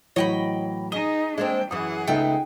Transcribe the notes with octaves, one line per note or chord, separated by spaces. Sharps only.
A2 E3 F#3 C#5 D#5 G5 B5
D#4 G#4 D#5 G7
G#3 A#3 C4 D4 G5
F#2 E3 G#4 F#5 D#6
C#2 A3 B3 D#4 G5